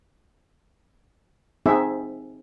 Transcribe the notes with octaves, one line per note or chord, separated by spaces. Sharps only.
C4 D#4 G#4 E5